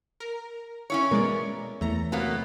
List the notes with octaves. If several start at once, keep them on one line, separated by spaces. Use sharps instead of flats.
A#4
C#4 E4 C#5
B2 G#3 A#4 D5
E2 A3 A#5
C3 F#3 A#3 B3